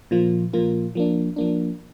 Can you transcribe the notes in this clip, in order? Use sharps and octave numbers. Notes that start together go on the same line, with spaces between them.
A#2 F3 A#3 F4
A#2 F3 A#3 F4
F3 A#3 D4
F3 A#3 D4